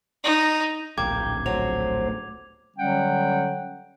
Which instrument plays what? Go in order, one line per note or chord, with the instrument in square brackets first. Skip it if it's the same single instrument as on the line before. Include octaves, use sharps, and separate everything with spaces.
[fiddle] D#4
[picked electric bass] D1 A#1 [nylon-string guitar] A#3 [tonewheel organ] G5 [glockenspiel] D6 G#6
[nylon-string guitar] F#3 [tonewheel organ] A3 C5 [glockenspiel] F7
[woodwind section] D3 F#3 G3 C#4 F#5 G5